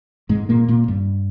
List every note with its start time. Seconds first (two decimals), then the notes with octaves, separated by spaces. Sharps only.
0.29 G#2 G#3
0.49 A#2 A#3
0.68 A#2 A#3
0.88 G2 G3